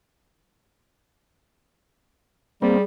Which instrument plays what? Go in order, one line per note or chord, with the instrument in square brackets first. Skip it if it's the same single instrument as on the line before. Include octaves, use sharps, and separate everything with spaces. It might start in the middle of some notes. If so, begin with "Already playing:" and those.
[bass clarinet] G3 [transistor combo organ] A#3 C4 [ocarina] G#4